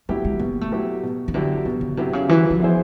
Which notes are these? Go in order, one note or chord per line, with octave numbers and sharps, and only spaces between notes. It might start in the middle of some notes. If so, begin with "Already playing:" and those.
F#3 A3 B3 E4 G4
G#3
B2 A#3
A3
F#3 B3 E4 G4
B2
D#3
D3 F#3 B3 E4 G4
B2 D3
C#3
C3 F#3 B3 E4 G4
C#3
E3 F#3
F3
B3 E4 G#4 C5